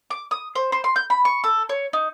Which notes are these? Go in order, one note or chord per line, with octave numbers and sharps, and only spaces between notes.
D6
D#6
C5
C5
C6
G6
B5
C#6
A4
C#5
D#4